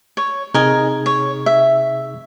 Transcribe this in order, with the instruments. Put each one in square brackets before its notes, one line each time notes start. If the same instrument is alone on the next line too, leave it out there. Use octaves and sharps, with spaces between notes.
[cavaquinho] C#5
[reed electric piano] C3 D#4 G#4 [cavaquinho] A#4 D#5 G#5
[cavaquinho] C#5
E5